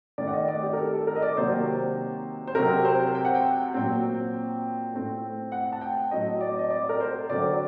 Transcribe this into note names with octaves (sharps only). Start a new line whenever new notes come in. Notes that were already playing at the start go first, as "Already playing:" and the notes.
D#3 A3 C4 D5
F#5
D#5
D5
G4
A#4
A4
A4
A#4
D#5
D5
C3 D#3 F#3 A#3 C5
C5
C3 F#3 C4 A#4
C5
G5
F#5
G5
A#2 F#3 C4
A2 A3 C4
F#5
A5
G5
A2 F#3 C4 D#5
D5
D#5
D5
A#4
C5
D3 F#3 C4 D5